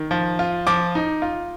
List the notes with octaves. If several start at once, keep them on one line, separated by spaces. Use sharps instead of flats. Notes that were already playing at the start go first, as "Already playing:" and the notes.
Already playing: D#3
F3
F4
F3 D6
D#4
F4